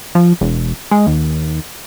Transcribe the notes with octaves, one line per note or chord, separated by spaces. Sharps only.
F3
E1
G#3
D#2